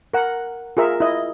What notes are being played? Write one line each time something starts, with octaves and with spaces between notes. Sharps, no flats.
A#4 F#5
F4 G#4 A#4 E5
E4 D#5